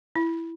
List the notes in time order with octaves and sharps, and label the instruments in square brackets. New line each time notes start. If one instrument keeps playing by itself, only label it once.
[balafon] E4